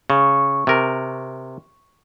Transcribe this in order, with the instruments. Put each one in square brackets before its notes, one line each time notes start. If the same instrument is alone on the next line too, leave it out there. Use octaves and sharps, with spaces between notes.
[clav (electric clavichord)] C#3 [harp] C#6
[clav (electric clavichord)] C3 A#4